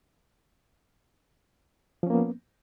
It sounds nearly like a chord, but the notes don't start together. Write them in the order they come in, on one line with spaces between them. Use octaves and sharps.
F3 C#4 A#3 B3